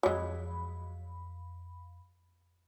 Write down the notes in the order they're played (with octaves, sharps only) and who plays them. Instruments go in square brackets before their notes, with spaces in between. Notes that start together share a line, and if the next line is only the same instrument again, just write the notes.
[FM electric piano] F2 B5 [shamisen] F#3 G#3